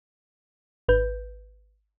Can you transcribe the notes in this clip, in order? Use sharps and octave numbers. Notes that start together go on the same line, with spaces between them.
G#1 B4 G6